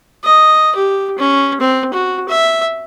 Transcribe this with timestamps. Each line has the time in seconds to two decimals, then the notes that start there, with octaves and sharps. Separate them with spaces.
0.24 D#5
0.75 G4
1.18 C#4
1.60 C4
1.93 F#4
2.28 E5